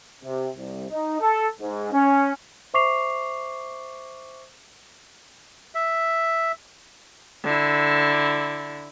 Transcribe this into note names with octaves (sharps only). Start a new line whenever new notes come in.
C3
C2
D#4
A4
G#2
C#4
C5 E5 C#6 D6 C7 F7
E5
D3 E4